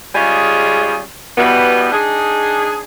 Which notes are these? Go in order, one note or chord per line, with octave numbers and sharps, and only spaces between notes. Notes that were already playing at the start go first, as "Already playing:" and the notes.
G3 G#3 C#4 F4 G#4
B2 E3 G3 B3
D4 D#4 G#4